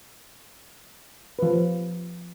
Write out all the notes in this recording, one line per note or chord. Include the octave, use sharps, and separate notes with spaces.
F3 B4